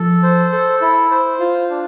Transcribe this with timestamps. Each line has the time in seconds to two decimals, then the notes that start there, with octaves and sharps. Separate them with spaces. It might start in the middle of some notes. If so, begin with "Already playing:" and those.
Already playing: F3 A4
0.23 C5
0.52 A4
0.81 E4
1.11 C5
1.40 F4
1.70 D4